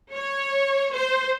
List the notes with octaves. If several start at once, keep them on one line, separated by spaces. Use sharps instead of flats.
C#5
C5